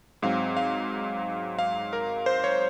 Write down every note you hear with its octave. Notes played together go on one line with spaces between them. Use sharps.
G#2 F#3 C4 F5
F5
F5
A#4
C5
C#5